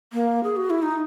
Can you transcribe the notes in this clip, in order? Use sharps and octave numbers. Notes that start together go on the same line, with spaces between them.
A#3
G#4
F#4
E4
D#4